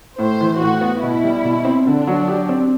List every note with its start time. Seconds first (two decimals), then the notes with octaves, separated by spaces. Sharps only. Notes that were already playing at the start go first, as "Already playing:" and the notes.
0.19 A2 C5
0.41 E3
0.61 A2 F#4
0.81 B3
1.02 B2 E4
1.24 G3
1.45 B2
1.65 C4
1.86 D3 D4
2.07 F#3
2.28 G4
2.49 C4